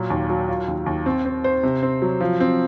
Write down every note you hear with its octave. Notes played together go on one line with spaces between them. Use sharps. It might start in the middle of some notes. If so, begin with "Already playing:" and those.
Already playing: A#2 F#3
D#2
F#3
F4
D#2
D#2
C4
C4
C5
C3
C4
F#3
F3
C4